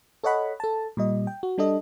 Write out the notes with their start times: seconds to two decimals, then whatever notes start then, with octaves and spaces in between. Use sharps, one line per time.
0.24 A4 C#5 D#5 F#5 B5
0.60 A4 A5
0.97 A#2 G3 D#5
1.27 G5
1.43 F#4
1.58 G3 D4 A4 D#5